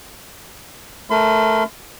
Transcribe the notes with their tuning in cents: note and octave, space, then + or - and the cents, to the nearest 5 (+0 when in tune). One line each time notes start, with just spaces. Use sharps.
A3 +0 A#4 +0 C6 -45